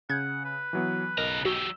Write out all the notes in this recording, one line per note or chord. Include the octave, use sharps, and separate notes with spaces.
C#3 F#5 G6 G#6
B4
E3 F#3 B3
B1 C#3 A#4 D#5 A#5
F#3 F#4 G4 E6